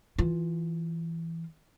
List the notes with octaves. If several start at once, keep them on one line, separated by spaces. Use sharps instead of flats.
E3 F4